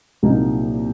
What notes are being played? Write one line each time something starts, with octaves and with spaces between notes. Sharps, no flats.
C2 A#2 F#3 A#3 D#4